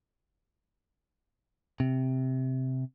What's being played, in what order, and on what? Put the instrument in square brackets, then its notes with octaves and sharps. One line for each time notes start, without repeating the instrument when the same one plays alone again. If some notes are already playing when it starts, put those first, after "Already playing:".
[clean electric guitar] C3